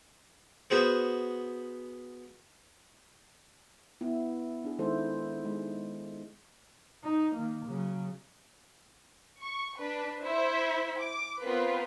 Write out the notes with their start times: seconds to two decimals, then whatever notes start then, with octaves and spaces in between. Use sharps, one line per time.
0.70 B3 F#4 G#4 C5
4.01 B3 E4
4.64 D4 G#4
4.78 D#3 G#3 E4 A4 C5
5.45 G#3
7.04 D#4
7.35 D#3 A#3
7.66 C#3 F#3
9.42 C#6
9.78 D4 B4
10.22 E4 C5 E5
11.01 D6
11.42 B3 C4 F4 A#4 B4